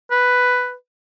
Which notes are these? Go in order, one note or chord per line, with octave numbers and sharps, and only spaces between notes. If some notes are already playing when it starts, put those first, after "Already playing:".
B4